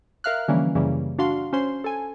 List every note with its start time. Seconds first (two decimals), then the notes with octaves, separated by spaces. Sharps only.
0.24 A#4 E5 F5 F6 F#6
0.48 D3 E3 F3 G3 A#3 C#4
0.75 F#2 C#3 E3 G3 A#3
1.18 D4 F#4 F5 F#5 C6
1.53 C#4 C5 C6
1.84 A4 G#5